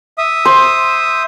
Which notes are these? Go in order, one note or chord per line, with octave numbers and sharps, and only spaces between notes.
E5 D#6
C5